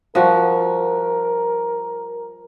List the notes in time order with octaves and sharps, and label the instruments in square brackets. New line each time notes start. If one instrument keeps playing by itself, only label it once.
[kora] F3 G3 F#4 [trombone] A#4